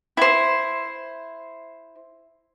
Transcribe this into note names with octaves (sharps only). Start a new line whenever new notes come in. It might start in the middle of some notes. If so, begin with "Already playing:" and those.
E4 C5